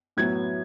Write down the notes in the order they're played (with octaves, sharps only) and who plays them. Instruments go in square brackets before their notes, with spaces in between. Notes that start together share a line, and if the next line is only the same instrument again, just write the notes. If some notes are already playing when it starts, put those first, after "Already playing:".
[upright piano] A2 F#3 B3 G#6